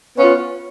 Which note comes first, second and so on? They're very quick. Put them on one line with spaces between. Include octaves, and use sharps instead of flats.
B3 C#4 F4